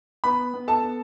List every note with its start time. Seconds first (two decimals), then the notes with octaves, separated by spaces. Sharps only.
0.24 B3 B4 B5
0.54 B3
0.68 A4 A5
0.82 B3